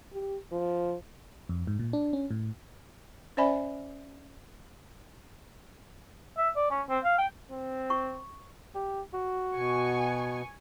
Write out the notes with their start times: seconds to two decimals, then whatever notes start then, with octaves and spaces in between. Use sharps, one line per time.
0.13 G4
0.52 F3
1.49 F2
1.67 G#2
1.80 A#2
1.93 D4
2.13 C#4
2.31 A2
3.37 C#4 C5 D5 E5 G#5 B5
6.37 E5
6.56 D5
6.70 C#4
6.89 C4
7.04 F5
7.18 G5
7.51 C4
7.90 C#6
8.75 G4
9.14 F#4
9.55 B2 G#5 C#6